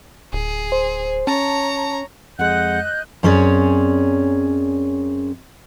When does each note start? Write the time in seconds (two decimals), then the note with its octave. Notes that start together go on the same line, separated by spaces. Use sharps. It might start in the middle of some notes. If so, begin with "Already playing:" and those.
0.33 D1 G#4
0.72 C5
1.27 C#4 C#5 A5 A#5
2.39 F2 G#3 D#5 F#5 F#6 G6
3.23 F#2 C4 C#4 G#4 C#5 D5